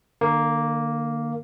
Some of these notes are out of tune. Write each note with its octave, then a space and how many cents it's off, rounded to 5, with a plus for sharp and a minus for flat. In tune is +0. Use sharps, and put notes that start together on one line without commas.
D3 +35 A#3 +0